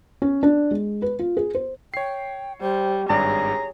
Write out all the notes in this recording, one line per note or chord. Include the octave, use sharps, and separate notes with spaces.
C#4
D4
G#3
B4
F4
G#4
C5
C#5 G5 C7
G3 C5
G#1 G2 G#4 C#5 D5 A#5